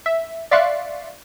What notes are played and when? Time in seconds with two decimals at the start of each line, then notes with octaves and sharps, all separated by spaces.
0.06 E5
0.51 D5 E5 F5 C6 C#6 F#6